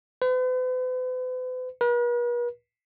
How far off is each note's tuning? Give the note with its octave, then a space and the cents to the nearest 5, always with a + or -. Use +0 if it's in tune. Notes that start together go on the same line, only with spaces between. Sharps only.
B4 +45
B4 -45